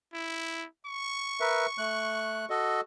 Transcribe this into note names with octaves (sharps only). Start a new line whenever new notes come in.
E4
C#6
A#4 B4 E5
A3 F#6
F#4 A4 D#5